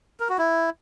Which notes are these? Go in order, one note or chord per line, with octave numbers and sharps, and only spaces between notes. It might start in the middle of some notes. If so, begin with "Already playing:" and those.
A#4
F#4
E4